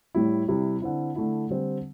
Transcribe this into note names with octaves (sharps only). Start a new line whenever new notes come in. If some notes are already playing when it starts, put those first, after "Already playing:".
A2 G3 E4
C3 G3 E4
D3 C4 E4
D3 A3 E4
D3 G3 C4